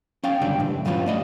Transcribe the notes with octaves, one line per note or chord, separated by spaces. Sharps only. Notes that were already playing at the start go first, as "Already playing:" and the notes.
C#4 F5 G5
C#2 F#2 D3 G3 D4 G5
A#2 E3
G2 F#3 G3 C#4 F4 B4
A3 D5 D#5